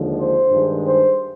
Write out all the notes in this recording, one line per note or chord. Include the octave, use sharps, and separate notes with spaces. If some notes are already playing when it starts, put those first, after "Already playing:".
Already playing: D#2 D3 F3 G#3
C5
G2 D#3 G#3
C5